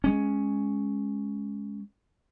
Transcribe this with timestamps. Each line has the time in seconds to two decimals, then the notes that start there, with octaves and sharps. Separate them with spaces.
0.04 G#3 C#4